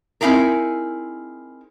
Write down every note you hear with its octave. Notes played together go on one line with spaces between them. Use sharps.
C4 D#4 E4 G#4 A#4